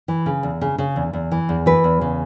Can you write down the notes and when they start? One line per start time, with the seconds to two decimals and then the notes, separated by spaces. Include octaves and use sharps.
0.08 E3
0.26 C#3
0.43 E2
0.61 C#3
0.78 C#3
0.96 E2
1.13 E2
1.31 E3
1.49 E2
1.66 E3 B4
1.84 E2
2.01 C#3